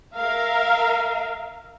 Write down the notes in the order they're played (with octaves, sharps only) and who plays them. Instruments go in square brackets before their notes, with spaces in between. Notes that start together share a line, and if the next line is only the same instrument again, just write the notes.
[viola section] A#4 E5 F5